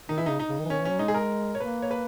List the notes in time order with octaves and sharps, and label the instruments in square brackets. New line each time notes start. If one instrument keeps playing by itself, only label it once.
[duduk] D#3 [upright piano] D#4
[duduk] E3 [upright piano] E4
[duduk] C#3 [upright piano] D#4
[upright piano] D#4
[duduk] C#3
D#3
E3
[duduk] D#3 [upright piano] C#4
[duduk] E3
[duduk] F#3 [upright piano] C#4
[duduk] G#3 [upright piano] D#4
[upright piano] G#4
A#4
C#5
[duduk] A#3 [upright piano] B4
[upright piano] C#5
B4